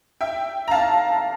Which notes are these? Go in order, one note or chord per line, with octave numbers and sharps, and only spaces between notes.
E5 G5
A#5
F5 A5